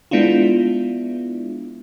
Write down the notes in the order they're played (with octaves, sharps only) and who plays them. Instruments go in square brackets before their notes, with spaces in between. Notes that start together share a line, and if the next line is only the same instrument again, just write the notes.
[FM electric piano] G#3 B3 D4 E4 F4